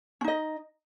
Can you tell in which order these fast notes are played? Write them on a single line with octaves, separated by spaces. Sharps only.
C#4 D#4 D#5